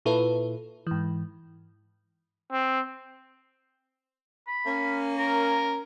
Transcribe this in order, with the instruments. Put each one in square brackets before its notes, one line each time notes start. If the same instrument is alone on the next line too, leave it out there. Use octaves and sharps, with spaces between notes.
[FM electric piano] A#2 E4 F4 A4 B4
G#2 E3
[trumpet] C4
[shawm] B5
[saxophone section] A#3 C#4
[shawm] A#4